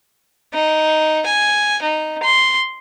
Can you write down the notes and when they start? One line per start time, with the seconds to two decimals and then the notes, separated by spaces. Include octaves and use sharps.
0.54 D#4
1.26 G#5
1.83 D#4
2.23 C6